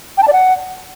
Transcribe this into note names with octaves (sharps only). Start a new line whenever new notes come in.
G5
A5
D5
F#5